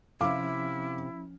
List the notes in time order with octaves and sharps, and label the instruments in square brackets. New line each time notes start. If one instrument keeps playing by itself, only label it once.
[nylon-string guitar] C3 [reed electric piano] F3 C#4 [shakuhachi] E4 [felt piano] F5 D6